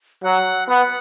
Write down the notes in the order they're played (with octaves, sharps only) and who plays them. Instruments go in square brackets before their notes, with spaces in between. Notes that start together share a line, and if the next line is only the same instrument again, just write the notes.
[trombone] F#3 [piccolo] F#5
[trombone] B3 [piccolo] F#5